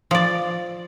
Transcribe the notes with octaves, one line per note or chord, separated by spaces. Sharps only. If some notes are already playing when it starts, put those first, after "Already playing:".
F3 D5